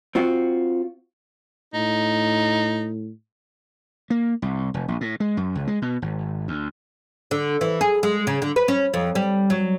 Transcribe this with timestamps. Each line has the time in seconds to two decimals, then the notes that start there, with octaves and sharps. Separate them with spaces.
0.15 C4 F4 F#4
1.74 A2 D#4
4.10 A#3
4.42 C2
4.74 F1
4.88 A#1
5.01 A2
5.20 G#3
5.37 F#2
5.55 C#2
5.67 G#3
5.82 B2
6.02 G#1
6.48 D2
7.31 D3
7.61 E3
7.81 G#4
8.03 G#3
8.27 C#3
8.42 D3
8.56 B4
8.68 C#4
8.94 F2
9.15 G3
9.50 F#3